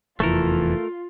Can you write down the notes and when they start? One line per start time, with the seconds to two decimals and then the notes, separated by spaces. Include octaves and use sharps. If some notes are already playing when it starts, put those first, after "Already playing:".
0.20 F1 E2 E3 A3 F4 A4 A#4